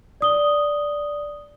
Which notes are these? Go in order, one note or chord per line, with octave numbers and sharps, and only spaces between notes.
D5 D#6 G7